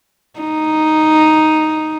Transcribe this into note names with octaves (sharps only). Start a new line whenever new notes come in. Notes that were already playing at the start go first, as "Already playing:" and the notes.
D#4